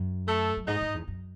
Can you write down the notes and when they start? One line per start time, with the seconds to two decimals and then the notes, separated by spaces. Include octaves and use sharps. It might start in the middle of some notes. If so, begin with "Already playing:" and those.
Already playing: F#2
0.28 A3 A4
0.57 F#2
0.67 G#2 D#4 D#5
0.81 G#2
0.94 E2
1.08 F#2